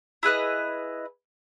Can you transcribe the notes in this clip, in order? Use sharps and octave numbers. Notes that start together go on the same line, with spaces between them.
E4 G#4 B4 D#5